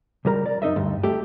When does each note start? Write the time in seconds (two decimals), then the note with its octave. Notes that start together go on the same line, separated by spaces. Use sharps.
0.25 C#2 G3 A#4 A#5
0.46 D5
0.62 F#2 D#4 D#5 E5
0.76 D2 G2
1.03 A3 G4